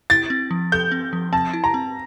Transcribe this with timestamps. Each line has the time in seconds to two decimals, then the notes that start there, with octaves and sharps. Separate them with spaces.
0.10 E4 A6
0.30 C4
0.51 F3
0.72 A4 G6
0.92 C4
1.13 F3
1.33 C4 A5
1.53 E4
1.64 A#5
1.74 C4